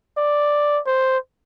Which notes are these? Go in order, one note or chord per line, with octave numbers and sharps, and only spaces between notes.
D5
C5